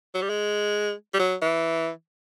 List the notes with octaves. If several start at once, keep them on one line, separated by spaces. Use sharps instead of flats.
F#3
G3
G#3
G3
F#3
E3